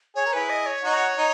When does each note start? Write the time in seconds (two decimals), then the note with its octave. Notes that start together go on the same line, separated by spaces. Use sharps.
0.15 G#4 C#5
0.26 A#4
0.33 E4 G#4 B4
0.50 D#5
0.66 C#5
0.83 D#4 F#4
1.17 D#4